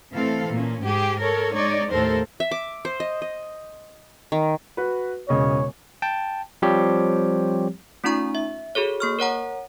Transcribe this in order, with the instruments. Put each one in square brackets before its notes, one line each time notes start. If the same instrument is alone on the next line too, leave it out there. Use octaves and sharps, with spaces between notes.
[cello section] A2 E3 C4 A4 F5
A#2 C#4
G#2 G4 G#4
A4 A#4 C#5
G#3 D#4 C#5 D5
D#2 A2 A4 A#4 C5
[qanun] E5
D6
C5
D#5
D#5
D#3
[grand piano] F#4 B4
[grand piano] E1 C#3 D#5 [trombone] C#5
[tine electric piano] G5 A5
F3 G3 C4 G4 C#5
[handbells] A3 C#4 D#4 F4 A#5 C#6
E5
F#4 G#4 A4 C#5
A#3 C#6 F6
A#4 C#5 F#5 A#5